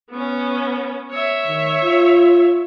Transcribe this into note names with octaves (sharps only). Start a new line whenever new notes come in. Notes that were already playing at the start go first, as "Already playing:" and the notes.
B3 C#4
C#5 E5
D#3
F4